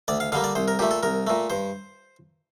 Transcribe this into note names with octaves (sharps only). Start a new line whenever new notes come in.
D2 D5
F5
D3 G3 A#3 F5
D5
C2 C5
A#4
A#2 A3 G4
A4
C2 A#4
A#2 A3
G2 C5